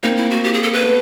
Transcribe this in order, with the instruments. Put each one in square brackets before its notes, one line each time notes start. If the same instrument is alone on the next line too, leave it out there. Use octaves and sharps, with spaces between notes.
[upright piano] A#3 C4 [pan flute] D#4
[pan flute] E4
F#4
G4
G#4
A4
B4
[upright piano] A3 B3